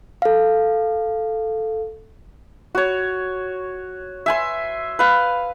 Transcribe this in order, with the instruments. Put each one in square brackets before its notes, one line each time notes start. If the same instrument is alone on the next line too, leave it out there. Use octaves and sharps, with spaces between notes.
[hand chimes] A4 F5
[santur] F#4 C#5
E5 G#5 C6
B4 F5